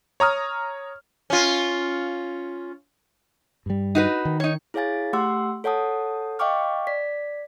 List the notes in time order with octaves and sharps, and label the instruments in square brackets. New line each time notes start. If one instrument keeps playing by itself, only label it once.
[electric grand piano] C#5 A#5 D#6 F6
[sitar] C#4 F4
[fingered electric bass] G2 G3
[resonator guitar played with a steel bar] D#4 F#4 B4
[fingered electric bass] D#3
[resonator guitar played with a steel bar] D#4 C#5
[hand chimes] E4 G#4 C#5 F5 G#5 A6
A3 G4 F#5 C6 E6
A4 C#5 F#5 A5 D#6
D#5 F5 G5 C#6 D6 F6
D5 B6